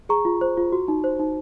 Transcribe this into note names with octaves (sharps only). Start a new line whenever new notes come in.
G#4 A#5 C#6
F4
C5
F4
F#4
D#4
C5
D#4